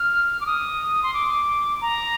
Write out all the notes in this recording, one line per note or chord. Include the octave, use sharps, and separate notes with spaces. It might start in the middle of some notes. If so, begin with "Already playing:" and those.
Already playing: F6
D6
D#6
C6
D6
A#5